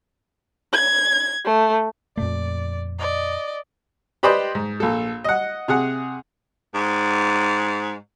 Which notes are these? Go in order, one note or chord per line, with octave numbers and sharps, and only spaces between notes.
G#6
A3
F2 A#2 A3 D5
D5 D#5
G4 B4 C5 D5 D#5 G5
G#2
A#1 A4
D#5 F#5
C3 G#4 F#5
G#2